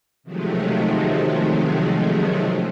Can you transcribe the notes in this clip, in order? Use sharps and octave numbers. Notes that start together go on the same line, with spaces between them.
C3 D#3 F3 F#3 G#3 A3